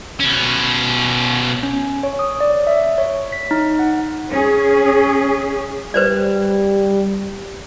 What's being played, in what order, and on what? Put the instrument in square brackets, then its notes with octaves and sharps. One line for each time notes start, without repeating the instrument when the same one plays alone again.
[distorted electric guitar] B2 C#4
[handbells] C#4
C#5
D#6
D5
E5
C#5
B6
D#4
F#5
[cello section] C#4 G#4
[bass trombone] G3 [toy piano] B4 C5 D5